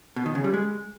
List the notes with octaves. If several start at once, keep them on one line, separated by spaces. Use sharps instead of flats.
B2
D#3
C#3
G3
G#3